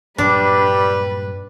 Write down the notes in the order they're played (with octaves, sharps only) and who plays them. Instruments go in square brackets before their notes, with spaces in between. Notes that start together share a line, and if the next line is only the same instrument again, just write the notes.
[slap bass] G2 A#2 F#3 [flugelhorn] G3 [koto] D4 [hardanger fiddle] B4